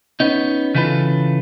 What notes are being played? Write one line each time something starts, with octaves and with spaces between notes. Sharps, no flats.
B3 C#4 D#4
C#3 E3 F4 A4 B4